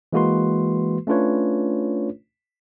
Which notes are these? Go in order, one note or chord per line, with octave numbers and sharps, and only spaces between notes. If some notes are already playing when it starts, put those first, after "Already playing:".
E3 G#3 A#3 F#4 B4 C6
A3 C#4 D4 F4 B4 C#5